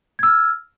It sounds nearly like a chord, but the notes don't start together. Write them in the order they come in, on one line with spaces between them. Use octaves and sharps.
G#6 E6 F6